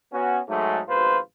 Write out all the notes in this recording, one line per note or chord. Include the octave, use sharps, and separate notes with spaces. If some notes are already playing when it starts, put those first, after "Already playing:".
B3 C#4 F#4
G#2 F#3 A3
G#1 B2 F3 F4 B4 C5